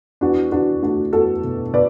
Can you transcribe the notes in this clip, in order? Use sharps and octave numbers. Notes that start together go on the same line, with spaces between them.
E2 D4 F#4
E2 D4 F#4
A3 D4 F#4
E2 F#4 A4
B2
B2 B4 D5